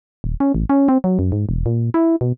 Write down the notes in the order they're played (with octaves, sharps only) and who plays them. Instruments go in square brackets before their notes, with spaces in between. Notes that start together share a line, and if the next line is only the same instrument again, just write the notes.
[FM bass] D#1
C#4
A1
C#4
C4
F#3
F#2
G#2
E1
A#2
E4
B2